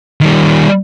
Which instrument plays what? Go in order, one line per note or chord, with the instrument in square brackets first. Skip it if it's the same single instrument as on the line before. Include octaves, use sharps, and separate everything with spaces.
[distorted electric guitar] D#3 G3